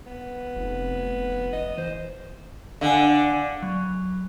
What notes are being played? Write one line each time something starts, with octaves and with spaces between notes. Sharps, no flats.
B3
F1
D#5
E3 C5
D3 F5 F#5 G#5
F#3